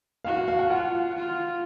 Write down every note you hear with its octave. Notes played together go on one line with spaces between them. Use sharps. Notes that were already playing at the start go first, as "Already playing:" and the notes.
F#4 F5
F5
F5
F#5
F4 F#5
F4